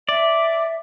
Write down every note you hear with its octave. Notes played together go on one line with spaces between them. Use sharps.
D5 E5